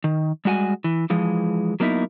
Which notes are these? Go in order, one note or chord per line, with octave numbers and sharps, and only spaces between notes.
D#3
G3 G#3 F#4 G5 G#5
E3
E3 F3 G#3
F#3 A#3 B3 D#4 E4